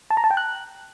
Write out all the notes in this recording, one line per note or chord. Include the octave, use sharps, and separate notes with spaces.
A5
A#5
A5
G5
F#6